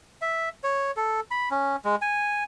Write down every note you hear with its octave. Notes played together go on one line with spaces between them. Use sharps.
E5
C#5
A4
B5
C#4
G#3
G#5